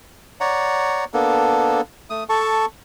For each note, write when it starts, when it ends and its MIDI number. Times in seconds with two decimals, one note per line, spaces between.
0.41 1.04 73
0.41 1.04 74
0.41 1.04 78
0.41 1.04 82
1.14 1.81 58
1.14 1.81 59
1.14 1.81 62
1.14 1.81 69
2.10 2.24 57
2.10 2.24 87
2.29 2.66 69
2.29 2.66 81
2.29 2.66 85